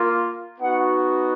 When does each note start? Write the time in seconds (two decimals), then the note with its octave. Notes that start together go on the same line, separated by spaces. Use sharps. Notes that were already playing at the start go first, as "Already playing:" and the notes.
Already playing: A#3 F4
0.60 B3 D#4 F#4 F#5